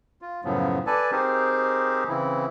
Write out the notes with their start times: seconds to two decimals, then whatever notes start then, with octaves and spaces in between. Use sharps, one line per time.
0.22 F4
0.45 F#2 A2 C#3 F3 F#3 B3
0.87 A4 B4 D5 G#5 A5
1.12 C4 D#4 G4 G#4 A#4 C5
2.08 C#3 E3 C4 E4